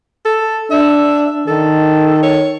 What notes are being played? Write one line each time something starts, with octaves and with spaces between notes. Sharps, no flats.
A4
D4 E5
D#3 A4
C#5